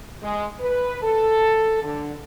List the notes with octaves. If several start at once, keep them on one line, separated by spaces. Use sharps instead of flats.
G#3
B4
A4
D3